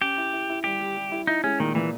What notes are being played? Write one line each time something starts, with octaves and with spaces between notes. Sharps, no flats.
C#4 G4
E4
E4
E4
G3 G4
G3
G3
E4
D#4 E4
G#3 C#4
A#2 D#3
A#2 E3